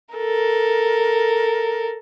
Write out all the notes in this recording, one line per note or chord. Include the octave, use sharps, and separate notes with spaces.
A4 A#4